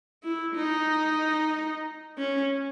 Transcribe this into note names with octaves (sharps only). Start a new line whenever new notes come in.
E4
D#4
C#4